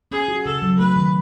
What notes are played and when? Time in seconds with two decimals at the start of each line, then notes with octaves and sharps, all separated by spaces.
0.11 C#4 G#4
0.28 F#4
0.45 C#3 A4
0.62 F#3
0.79 A3 B4
0.96 D#3